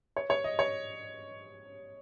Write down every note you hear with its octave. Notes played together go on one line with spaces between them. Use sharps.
C#5
C#5
D#5
C#5